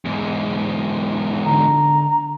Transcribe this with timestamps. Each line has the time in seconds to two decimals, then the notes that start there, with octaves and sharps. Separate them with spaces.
0.05 E2 G#2
1.45 D3 A#5